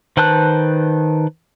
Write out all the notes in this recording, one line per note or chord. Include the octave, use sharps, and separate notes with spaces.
D#3 B4 C5 A5 F#6